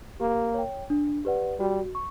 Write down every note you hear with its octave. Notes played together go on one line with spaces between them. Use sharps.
A#3 G4
C#5 G5
D4
G4 B4 D5 F#5
G3 F#4
C#6